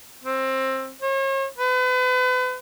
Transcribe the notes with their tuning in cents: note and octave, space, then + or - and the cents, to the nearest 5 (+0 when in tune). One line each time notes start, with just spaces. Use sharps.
C4 +20
C#5 -40
B4 +35